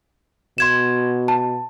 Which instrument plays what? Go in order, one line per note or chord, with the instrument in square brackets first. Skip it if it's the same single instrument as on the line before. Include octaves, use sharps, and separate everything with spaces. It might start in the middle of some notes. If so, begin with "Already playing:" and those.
[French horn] B2 [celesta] C6 G#6 E7
[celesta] A5